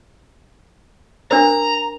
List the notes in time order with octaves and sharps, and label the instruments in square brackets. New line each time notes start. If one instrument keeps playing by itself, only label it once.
[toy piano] D4 A#4 C5 [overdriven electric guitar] A#5